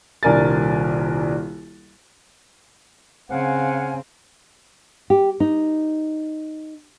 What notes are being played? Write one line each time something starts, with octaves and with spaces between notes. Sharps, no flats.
D#1 C2 D4 A#4 G#5 A6
C#3 C4 F5 F#5 G#5
G4
D#4